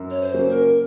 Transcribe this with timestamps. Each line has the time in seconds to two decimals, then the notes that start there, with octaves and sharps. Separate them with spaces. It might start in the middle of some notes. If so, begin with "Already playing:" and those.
Already playing: F#2
0.10 C#5
0.21 C5
0.34 C#3 F#3 A#3 C#4
0.49 A#4